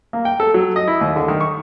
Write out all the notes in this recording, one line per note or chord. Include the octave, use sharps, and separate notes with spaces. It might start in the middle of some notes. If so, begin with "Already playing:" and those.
A#3
G5
A4
F#3
D#5
E4
D#2
D3
D#3
C#6